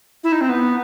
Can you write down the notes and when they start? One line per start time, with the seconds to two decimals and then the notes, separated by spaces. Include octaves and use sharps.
0.24 E4
0.32 D#4
0.41 C4
0.49 B3